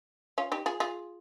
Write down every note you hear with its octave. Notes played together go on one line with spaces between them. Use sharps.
C#4 F4
D#4 G4
F4 G#4
F4 G#4